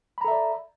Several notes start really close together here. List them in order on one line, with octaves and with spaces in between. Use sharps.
B5 A#5 A4 E5 D5